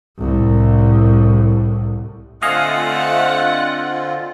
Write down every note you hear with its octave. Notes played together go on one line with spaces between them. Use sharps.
C2 A2
D3 A3 C4 F4 D#5 F5 F#5 G#5